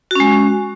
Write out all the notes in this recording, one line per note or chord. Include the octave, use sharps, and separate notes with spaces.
G#3 C#4 F#4